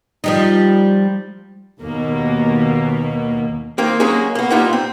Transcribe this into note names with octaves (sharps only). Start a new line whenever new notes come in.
F3 G3 D#4
D#2 B2 A#3
D#3 A#3 C4
F#3 G#3 A#3 C#4 G#4
A#3 B3
A#2 G3 B3 D#4 F4
C4